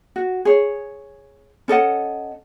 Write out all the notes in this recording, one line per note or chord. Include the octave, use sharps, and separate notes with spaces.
F#4
G#4 C#5
C#4 A4 D#5 F#5